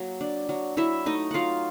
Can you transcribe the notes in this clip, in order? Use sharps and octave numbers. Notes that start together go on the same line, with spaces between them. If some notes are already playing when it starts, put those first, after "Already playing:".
Already playing: F#3 A#3
D4
F#3
F#3 E4 E5
A3 D#4 D#5
F#3 F4 F5 F#5